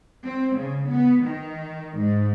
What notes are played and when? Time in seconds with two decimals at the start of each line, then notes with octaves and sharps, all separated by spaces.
0.25 C4
0.57 C#3
0.89 B3
1.25 D#3
1.99 G#2